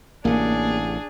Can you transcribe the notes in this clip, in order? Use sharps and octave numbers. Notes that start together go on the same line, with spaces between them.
A1 C3 A#3 D4 G#4